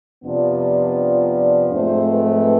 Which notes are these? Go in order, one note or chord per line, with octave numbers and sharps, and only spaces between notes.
F2 C3 F3 B3 D4 D5
G#2 F3 A3 C4 C5
B4